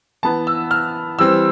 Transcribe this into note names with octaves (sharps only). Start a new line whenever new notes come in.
E3 B3 A5
E6
F6
E3 G3 C4 E6